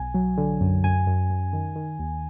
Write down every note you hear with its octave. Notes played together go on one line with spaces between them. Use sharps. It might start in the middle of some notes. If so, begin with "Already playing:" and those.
Already playing: B1 G#5
F#3
D3
F#2
F#2 G#5
F#2
F#2
D#3
D#3
D#2